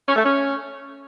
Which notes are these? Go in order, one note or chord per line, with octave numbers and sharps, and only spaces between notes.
C#4
A3
C#4